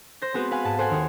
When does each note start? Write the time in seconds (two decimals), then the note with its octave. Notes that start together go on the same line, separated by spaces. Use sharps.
0.22 C5 G6 A#6
0.34 G#3 B3 C4 F#4 B4 C5
0.51 B4 F5 F#5 G#5
0.64 G#2 A5
0.78 A4 C5 F#5 G#5
0.90 D#2 D#4